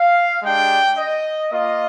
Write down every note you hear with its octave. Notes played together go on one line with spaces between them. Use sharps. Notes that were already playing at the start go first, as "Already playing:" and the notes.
Already playing: F5
G#3 D4 G4 G5
D#5
A#3 F4 D#5